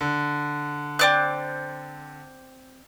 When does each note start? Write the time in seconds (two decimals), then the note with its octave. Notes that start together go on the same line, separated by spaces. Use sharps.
0.01 D3
0.99 C4 D5 F#6